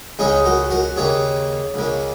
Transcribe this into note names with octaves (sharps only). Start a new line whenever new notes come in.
C#2 C#3 G#3 D#4 G#4 C#5
F#4 A#4
F#4 A#4
D#2 C#3 A#3 G#4 C#5
C#2 C#3 A#3